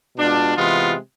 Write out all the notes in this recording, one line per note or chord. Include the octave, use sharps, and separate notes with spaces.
B2 G#3 D4 F4
C3 E3 G#3 B3 F4